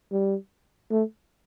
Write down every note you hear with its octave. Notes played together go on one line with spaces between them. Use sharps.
G3
A3